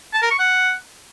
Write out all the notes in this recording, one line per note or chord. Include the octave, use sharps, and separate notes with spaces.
A5
A#4
C#6
F#5